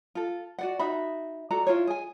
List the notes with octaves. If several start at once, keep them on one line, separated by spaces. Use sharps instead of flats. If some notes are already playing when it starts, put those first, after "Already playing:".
F4 A4
F#4 D5 F#5
D#4 F#4 E5 B5
F#4 A4 D5 A#5
E4 F4 G#4 C#5
G#4 G#5